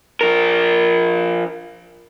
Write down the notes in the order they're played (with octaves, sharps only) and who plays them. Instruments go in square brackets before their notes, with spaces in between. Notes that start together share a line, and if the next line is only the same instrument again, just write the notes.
[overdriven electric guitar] F3 A#4